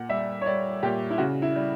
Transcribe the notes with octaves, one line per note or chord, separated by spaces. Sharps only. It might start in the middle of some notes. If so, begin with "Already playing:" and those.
Already playing: A#2 F#5
G3 E5
C#5
G3 D5
A#2 G4
E4
C#3 F#4
E4
G3